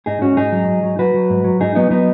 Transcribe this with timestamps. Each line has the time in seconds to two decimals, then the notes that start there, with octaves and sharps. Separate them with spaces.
0.06 G#2 D#4 G#4
0.21 G#2 C#4 F#4
0.36 G#2 D#4 G#4
0.52 F#3
0.68 G#2
0.83 F#3
0.99 F#3 F#4 B4
1.14 F#3
1.30 G#2
1.44 F#3
1.60 G#2 D#4 G#4
1.75 F#3 B3 D#4
1.90 F#3 B3 D#4